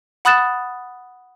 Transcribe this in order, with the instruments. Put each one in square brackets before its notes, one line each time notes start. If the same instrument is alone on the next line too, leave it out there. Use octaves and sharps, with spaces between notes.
[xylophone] F#5 B5 D#6 F#6 A6 E7